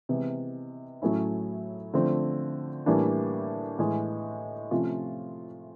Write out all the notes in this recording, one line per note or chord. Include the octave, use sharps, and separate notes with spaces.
C3 E3 G#3 B3
A2 F#3 A3 C#4 E4
D3 F3 A3 C4
A2 E3 G3 A#3 D4
A2 E3 G#3
C3 F3 A3 C#4 F4